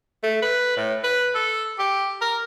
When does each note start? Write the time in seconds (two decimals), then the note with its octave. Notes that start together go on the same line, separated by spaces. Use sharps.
0.23 A3
0.42 B4
0.76 A2
1.03 B4
1.35 A4
1.79 G4
2.21 A#4